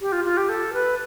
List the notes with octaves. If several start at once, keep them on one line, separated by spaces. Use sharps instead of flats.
G4
F4
F4
G4
A4
B4